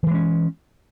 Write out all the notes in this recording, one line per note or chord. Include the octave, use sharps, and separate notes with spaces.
E3 F3 G#3 C#4